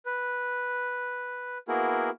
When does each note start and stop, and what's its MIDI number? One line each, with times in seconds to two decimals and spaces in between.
0.06 1.58 71
1.68 2.10 58
1.68 2.10 59
1.68 2.10 64
1.68 2.10 66
1.68 2.10 68
1.68 2.10 70